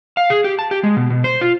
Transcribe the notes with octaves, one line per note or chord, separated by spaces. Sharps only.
F5
G#4
G4
A5
G4
G#3
B2
B2
C5
F4